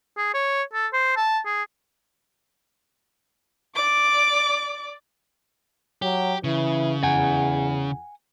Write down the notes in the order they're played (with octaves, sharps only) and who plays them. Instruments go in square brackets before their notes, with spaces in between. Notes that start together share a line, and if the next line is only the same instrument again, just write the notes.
[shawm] G#4
C#5
A4
C5
A5
G#4
[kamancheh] D5 D6
[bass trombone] F#3 [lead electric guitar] G4
[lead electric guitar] C#3 [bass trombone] E3
[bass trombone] E2 [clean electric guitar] F#5 G#5